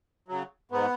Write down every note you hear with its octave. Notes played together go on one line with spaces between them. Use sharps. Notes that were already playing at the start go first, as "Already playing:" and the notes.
C#3 F#3
G#2 B3